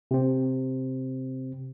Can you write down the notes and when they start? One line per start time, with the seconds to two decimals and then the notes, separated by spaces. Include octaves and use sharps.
0.11 C3 C4